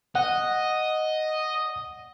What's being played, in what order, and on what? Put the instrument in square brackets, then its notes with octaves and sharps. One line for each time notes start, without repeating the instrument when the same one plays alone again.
[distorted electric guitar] D#5 [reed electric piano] F#5